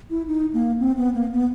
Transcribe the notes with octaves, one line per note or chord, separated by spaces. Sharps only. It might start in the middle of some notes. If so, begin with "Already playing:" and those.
E4
D#4
A#3
C4
B3
A#3
B3